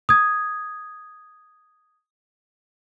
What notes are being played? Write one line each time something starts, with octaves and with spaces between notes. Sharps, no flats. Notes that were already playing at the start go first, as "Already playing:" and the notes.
D#6 G#6